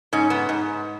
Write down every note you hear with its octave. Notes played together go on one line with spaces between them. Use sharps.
G#2 C#4
B3
G#2